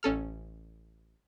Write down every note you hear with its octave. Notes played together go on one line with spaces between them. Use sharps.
A1 C#4 A4 F6